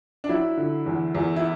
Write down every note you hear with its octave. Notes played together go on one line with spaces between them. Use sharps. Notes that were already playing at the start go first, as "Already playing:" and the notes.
D4
F#3 E4
D3
E2
E2
E4